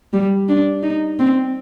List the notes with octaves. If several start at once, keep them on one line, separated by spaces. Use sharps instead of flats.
G3
D4
D#4
C4